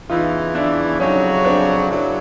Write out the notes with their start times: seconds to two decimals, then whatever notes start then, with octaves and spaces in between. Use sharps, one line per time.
0.10 E2 C#3 E3 D#4 F4
0.55 D4 E4
1.00 F2 C#3 F#3 C#4 D#4
1.45 C4 D4
1.90 F#2 C#3 F#3 D4 E4